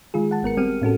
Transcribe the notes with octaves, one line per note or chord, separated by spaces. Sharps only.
D#3 G#3 F4 G#4
F#5 A5
G#1 B3 A#4 C#7
G3 C4 G4 F6 D#7
A2 C#4 F#4 A4